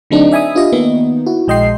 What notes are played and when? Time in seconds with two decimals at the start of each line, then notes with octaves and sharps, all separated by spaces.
0.11 D3 F#3 A3 C4 D4 D#4
0.31 D5 E5 G#5 B5 D#6
0.55 D4 F4 G4 D#5 E5
0.72 D#3 A#3 B3 D#4
1.26 E4 F#4
1.48 A#1 G#3 D#5 G5 C6 C7